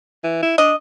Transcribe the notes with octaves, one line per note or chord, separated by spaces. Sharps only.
E3
E4
D4 D#5